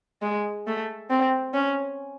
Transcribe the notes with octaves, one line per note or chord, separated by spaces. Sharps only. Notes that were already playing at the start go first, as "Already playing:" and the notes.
G#3
A3
C4
C#4